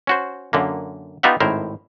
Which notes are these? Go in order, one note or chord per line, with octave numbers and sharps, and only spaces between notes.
C#4 F#4 C5
F#2 D3 A#3
B3 D#4 F4 G4 E5 F#5
G#1 A2 E4 A#4 C5